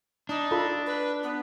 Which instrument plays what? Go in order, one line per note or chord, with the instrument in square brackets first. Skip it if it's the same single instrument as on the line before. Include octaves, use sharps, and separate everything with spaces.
[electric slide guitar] D4 [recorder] D#4
[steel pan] F4 A4 B5
[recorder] B4
B3